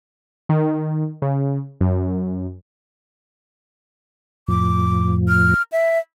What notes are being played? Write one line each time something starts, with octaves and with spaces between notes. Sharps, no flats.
D#3
C#3
F#2
F2 A2 F3 D6
F6
E5